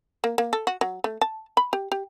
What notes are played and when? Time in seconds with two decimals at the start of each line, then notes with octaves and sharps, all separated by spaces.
0.24 A#3
0.38 A#3
0.53 A4
0.67 F#4
0.81 F#3
1.04 A3
1.21 A5
1.57 B5
1.73 G4
1.92 G4